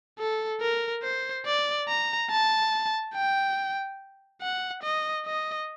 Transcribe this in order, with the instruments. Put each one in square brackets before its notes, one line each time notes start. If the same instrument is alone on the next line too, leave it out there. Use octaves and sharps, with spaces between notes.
[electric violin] A4
A#4
C5
D5
A#5
A5
G5
F#5
D#5
D#5